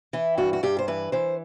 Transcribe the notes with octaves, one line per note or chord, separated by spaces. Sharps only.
E3 E4
G2 F#4
F#4
G2 G4
C5
E3 B4
E3 C5